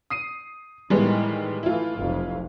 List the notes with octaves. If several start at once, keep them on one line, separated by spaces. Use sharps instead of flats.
D#6 C7 D#7
A2 D#3 E3 G3 G#3 B3
E3 A3 E4 F4
F1 B1 F2